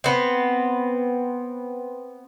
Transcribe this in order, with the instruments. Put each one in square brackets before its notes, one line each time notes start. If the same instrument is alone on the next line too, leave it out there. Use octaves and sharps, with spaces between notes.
[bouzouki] B3 C4